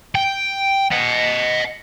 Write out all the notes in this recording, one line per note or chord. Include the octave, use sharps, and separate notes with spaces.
G5
D#5 F#5